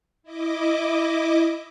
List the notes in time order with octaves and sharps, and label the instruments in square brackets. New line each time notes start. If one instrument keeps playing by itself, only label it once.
[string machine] E4 D#5 D6